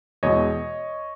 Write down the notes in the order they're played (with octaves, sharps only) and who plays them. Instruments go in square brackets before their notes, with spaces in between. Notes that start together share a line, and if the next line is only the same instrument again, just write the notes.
[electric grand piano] E2 B2 G#3 C#5 D#5